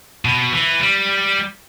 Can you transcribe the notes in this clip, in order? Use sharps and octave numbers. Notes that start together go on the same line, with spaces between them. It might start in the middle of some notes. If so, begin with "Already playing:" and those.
B2
E3
G3